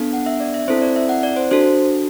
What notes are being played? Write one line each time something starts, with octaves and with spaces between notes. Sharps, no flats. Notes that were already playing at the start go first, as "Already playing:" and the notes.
Already playing: B3 D4 A4
F#5
E5
D5
E5
C4 E4 A4 C5
D5
E5
F#5
D5
C5
D4 F#4 A4 C5